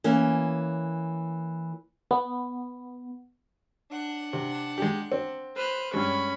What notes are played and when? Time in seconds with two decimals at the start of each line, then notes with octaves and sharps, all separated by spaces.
0.04 E3 A#3 C#4
2.11 B3
3.90 D4 F#5
4.33 C3
4.78 G#3 G4
5.12 C4
5.56 B4 C5 F6
5.94 G2 G#3 C#4 B5 C#6